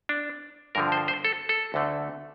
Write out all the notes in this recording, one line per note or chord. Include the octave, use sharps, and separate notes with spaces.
D4
G2 D3 F3 A#4
C5
C5
A4
A4
D2 D3 A3